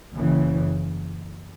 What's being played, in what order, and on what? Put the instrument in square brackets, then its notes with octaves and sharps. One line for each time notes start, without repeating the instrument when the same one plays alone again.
[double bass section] F#1 F#2 C#3 E3